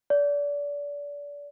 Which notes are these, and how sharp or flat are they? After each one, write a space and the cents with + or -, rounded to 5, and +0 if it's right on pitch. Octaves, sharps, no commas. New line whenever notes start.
D5 -30